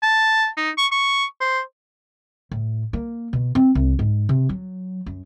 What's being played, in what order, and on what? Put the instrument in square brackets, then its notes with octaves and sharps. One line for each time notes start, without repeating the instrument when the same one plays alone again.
[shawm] A5
D#4
C#6
C#6
C5
[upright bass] A2
A#3
B2
C4
C2
G#2
C3
F#3
F#2